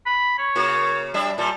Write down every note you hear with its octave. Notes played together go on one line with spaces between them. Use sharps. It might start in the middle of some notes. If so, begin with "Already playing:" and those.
B5
C#5
C#3 A#3 F#4
G3 D4 E5
A#2 G3 A5